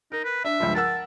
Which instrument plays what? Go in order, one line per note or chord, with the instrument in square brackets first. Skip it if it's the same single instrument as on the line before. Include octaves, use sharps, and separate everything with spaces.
[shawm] D#4 [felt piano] A#4
[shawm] B4
[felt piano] D4 [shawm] E5
[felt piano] C#2 G2 F3
[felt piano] A#4 F#5 E6 [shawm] A5